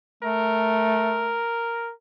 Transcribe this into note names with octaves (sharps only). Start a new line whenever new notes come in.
A3 A#4